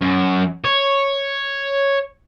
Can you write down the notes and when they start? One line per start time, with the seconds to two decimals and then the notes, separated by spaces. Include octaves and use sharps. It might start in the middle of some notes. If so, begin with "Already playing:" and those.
0.02 F#2
0.65 C#5